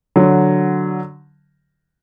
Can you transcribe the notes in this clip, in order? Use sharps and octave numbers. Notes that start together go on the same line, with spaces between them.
D3 F#3